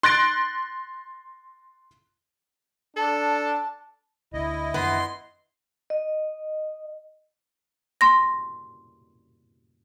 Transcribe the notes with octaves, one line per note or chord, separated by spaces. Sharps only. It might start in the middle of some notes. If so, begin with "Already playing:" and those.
C6 F#6 A6 A#6 D7
D4 A4 A5
D2 E4 D#5
F#2 D#3 B3 D4 C6
D#5
C6 A#6